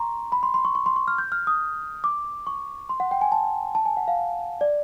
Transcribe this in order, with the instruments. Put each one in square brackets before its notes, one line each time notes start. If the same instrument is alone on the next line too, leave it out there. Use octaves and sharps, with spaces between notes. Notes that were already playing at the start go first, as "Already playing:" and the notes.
Already playing: [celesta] A#5 C6 C#6
B5
C6
C6
C#6
C#6
C6
C#6
F6
G6
F6
D#6
D6
C#6
C6
F#5
G5
G#5
A5
A5
G#5
F#5
F5
D5